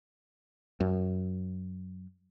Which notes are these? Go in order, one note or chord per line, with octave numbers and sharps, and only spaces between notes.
F#2